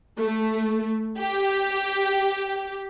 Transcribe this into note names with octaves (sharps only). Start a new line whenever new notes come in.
A3
G4